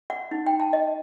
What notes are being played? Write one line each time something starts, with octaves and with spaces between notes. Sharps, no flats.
F#5
D#4
G5
A5
D#5